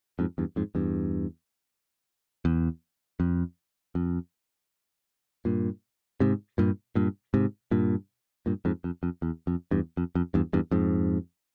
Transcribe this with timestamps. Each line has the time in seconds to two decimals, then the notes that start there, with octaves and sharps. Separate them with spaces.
0.19 F2 G#2
0.38 E2 G2
0.56 F2 G#2
0.75 E2 G2
2.45 E2
3.20 F2
3.95 F2
5.45 G2 A#2
6.20 G#2 C3
6.58 G2 A#2
6.95 G2 A#2
7.34 G#2 C3
7.71 G2 A#2
8.46 G2 A#2
8.65 F2 G#2
8.84 F2
9.03 F2
9.22 E2
9.47 F2
9.71 E2 G2
9.97 F2
10.15 F2
10.34 E2 G2
10.53 E2 G2
10.71 F2 G#2